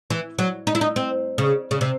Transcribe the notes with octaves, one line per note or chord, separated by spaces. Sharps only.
E3
F#3
D#4
E4
D#4
C4
C#3
C#3
C3